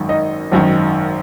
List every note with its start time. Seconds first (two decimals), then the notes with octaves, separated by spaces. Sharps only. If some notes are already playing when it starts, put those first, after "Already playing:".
Already playing: G#1 F#2 D#3
0.09 D#4 D#5
0.51 G#1 F#2 D#3